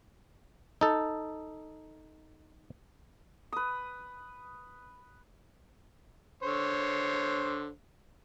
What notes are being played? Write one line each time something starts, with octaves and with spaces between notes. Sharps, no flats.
D#4 A4
B4 D#6
D3 C5 C#5